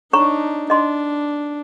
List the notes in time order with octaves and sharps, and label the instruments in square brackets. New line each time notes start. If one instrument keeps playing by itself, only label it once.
[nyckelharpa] D4 D#4 [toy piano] C#5 A#5 C#6
[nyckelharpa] D4 [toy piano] D#5 C6